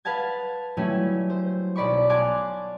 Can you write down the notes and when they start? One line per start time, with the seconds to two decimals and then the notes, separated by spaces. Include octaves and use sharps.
0.05 B4 F5 F#5 A5 G#6
0.77 F#3 G3 A3 C#4 E4 F4
1.30 C5
1.76 B1 D5 B5 C#6
2.09 F5 G#5 A5 C6 D6 F#6